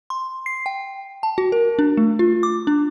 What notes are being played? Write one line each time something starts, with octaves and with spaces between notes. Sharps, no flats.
C6
C7
G5
A5
F#4
A#4
D4
A3
F4
D6
D4